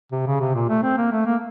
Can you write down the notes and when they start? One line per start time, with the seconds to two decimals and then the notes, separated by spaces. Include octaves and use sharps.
0.12 C3
0.27 C#3
0.40 C3
0.55 A#2
0.69 A3
0.83 C4
0.97 A#3
1.12 A3
1.26 A#3